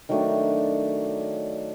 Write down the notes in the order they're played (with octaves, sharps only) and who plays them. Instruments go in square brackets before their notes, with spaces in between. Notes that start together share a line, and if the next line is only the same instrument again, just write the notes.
[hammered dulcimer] D#3 F#3 A3 D4